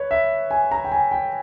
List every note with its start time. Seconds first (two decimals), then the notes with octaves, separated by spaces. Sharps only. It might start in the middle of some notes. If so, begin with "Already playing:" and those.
Already playing: B4 C#5
0.11 E5
0.51 G#5
0.71 A#5
0.85 G5
0.92 G#5
1.12 G5